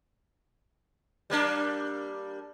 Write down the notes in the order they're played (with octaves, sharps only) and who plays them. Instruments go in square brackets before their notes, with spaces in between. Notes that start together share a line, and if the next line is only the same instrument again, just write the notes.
[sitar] G3 A#3 D4